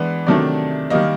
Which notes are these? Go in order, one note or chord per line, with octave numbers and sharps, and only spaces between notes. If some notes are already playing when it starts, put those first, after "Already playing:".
Already playing: E3 G#3 B3 D4
C3 D#3 F#3 A3 D4 D5
D#3 G3 A#3 D#5